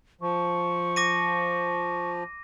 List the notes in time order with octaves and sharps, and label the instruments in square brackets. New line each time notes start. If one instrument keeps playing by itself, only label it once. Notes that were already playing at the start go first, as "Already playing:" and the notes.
[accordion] F3 [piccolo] C#6
[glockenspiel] D6 A#6 D#7